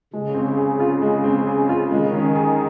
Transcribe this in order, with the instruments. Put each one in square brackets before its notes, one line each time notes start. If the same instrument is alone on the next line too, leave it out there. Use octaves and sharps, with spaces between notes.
[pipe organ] C#3 [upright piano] G#3
[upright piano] C4
G#4
F4
G#3
C4
G#4
F4
[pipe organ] D#3 [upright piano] G#3
[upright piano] C#4
G#4